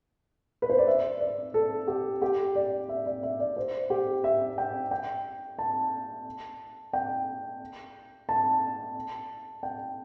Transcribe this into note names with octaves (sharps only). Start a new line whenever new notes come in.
B4
C5
D5
E5
D5
A4
G4
G4
D5
E5
D5
E5
D5
C5
G4
E5
G5
G5
A5
G5
A5
G5